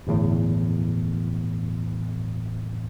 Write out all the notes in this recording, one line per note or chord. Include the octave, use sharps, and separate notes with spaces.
G1 E2 A2